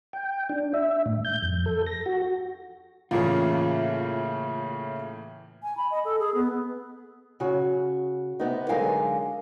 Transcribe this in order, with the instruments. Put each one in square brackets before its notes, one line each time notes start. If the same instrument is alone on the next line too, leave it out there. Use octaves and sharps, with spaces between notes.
[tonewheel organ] G5
D4
E5
A2
G6
F2
A4
A#6
F#4
[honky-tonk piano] A2 E3 [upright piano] C#3 A#3 [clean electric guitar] F4
[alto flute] G#5
B5
D#5
A4
G#4
B3
[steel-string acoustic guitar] C#3 F#4
C3 B3 D#4
D3 F#3 G#3 A#4 F5 G#5